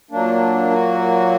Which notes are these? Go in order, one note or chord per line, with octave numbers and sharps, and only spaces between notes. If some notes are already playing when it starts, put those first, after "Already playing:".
A#2 F#3 A#3 D4
F#4